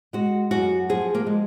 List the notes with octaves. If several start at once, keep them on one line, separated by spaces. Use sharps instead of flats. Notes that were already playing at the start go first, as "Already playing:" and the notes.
G#3 F#4
F#2 F#4
F3 G#4
A#3
G#3